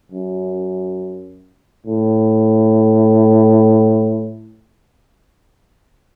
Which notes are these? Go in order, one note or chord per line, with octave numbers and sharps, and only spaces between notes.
F#2
A2